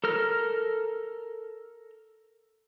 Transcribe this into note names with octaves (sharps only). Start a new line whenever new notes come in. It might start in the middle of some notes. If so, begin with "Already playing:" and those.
A4 A#4 F6